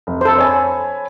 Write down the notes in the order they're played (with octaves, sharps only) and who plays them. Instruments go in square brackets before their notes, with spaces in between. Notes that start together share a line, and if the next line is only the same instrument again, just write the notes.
[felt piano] F1
[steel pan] A4 C5
[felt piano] C#5 G#5 B5